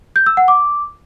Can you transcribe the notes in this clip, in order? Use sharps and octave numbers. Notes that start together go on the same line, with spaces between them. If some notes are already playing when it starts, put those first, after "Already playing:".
G6
E6
F#5
D6